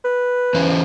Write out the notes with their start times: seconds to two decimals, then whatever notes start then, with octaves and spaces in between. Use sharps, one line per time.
0.04 B4
0.54 E3 C#4 C5